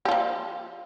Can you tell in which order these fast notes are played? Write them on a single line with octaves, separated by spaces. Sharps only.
G4 F4 F3